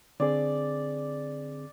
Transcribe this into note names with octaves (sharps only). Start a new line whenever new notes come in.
D3 C4 G#4 D5